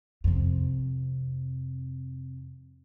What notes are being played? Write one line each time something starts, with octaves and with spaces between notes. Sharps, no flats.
F2 C3